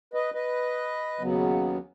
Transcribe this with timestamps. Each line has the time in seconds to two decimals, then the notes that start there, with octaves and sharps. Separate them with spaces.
0.14 B4 D#5
0.34 B4 D#5
1.19 D#2 C#3 F#3 B3